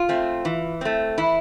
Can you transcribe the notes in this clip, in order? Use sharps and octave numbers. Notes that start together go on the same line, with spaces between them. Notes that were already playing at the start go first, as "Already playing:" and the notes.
Already playing: F4
A3 C4
E3
A3 C4
E3 E4